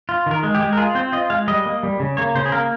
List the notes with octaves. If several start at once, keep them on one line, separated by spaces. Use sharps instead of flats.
F4
D#3 A#4
G#3
G4
G#3
A#4
F4 G#4
C4 C5
F4 D#5
G#3 F5
G3 D#5
A#3
G3
C#3
A#3 C#5
C#3 C5
G#4
A#3 A#4